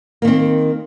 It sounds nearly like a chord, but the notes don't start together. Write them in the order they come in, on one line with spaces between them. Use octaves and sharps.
A#3 D#3 C4